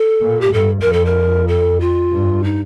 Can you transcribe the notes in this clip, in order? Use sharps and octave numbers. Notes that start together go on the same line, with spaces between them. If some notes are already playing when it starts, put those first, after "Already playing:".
Already playing: A4
A#2
G4
G2 A4
F2 A#4
A4
A#4
A4
F4
G2
D#4